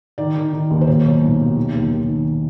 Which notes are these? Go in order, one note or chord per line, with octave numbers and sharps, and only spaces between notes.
D#3 D5
D#3
D#3
D#2
C5
A#2 C#5
B1
B1
B1
D#3
D#2
D#2
D#3